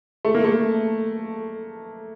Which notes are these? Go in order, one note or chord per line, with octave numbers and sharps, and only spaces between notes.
A3
A#3
A3